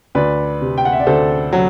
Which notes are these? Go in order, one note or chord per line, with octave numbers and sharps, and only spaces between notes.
D2 B4 D5
C3
G5
F#5
E5
D5
D2 A4 C5
F#3